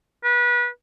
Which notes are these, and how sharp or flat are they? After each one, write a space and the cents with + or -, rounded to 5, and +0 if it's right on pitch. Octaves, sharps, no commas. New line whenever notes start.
B4 -30